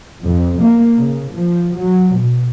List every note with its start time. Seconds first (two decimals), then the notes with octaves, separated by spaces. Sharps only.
0.24 F2
0.61 A#3
1.00 C#3
1.34 F3
1.79 F#3
2.16 B2